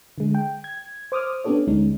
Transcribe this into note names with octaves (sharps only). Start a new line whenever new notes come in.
D3 G#3
G5
G#6
C5 D6 D#6 F6
B3 C#4 D4 G4 A4 C#5
D2 G#3 C#4 D#4